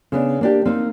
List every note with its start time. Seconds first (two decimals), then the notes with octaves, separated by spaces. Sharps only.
0.12 C#3 B3 D4
0.41 A#3 D4 G4
0.65 A#3 C4 D#4